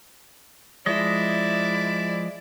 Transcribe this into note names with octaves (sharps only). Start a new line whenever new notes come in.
F3 G#3 E4 D5 D#5